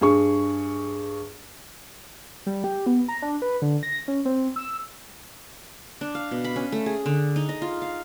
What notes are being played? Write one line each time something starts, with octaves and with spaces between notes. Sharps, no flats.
G2 G#4 C#6
G3
G4
B3
A#5
D4
B4
D3
A#6
C#4
C4
E6
D4
F5
B2
B5
C#4
A3
G#4
D3
D#4
D#5
F4
F5